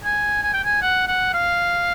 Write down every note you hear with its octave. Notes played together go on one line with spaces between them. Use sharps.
G#5
G#5
G5
G#5
F#5
F#5
F5